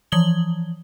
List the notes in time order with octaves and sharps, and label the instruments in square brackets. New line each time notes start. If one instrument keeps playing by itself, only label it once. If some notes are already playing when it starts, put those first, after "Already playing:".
[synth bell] E3 F3 D#6 G#6 F#7 G7